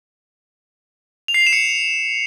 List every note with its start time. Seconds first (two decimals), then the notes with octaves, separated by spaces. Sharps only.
1.28 F7
1.34 C7
1.40 F7
1.47 E7
1.53 C#7